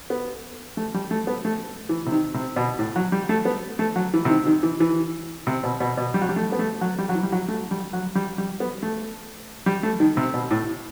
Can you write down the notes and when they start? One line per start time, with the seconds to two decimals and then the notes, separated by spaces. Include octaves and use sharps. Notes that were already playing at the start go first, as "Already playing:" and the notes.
0.10 B3
0.77 A3
0.94 G3
1.11 A3
1.27 B3
1.45 A3
1.89 E3
2.06 C3
2.12 D#3
2.34 C3
2.56 B2
2.79 A2
2.96 F#3
3.12 G3
3.29 A3
3.45 B3
3.79 A3
3.96 F#3
4.14 E3
4.25 C3
4.29 D#3
4.47 D#3
4.63 E3
4.80 E3
5.47 C3
5.63 B2
5.80 B2
5.97 B2
6.14 G3
6.21 F#3
6.29 G3
6.36 A3
6.52 B3
6.59 A3
6.81 F#3
6.98 G3
7.09 F#3
7.15 E3
7.23 G3
7.32 F#3
7.48 A3
7.71 G3
7.93 F#3
8.15 G3
8.38 G3
8.60 B3
8.83 A3
9.66 G3
9.83 A3
10.00 D#3
10.17 C3
10.34 B2
10.51 A2